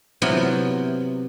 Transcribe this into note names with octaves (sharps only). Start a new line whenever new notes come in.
C3 F#3 B3 E4 F4 C5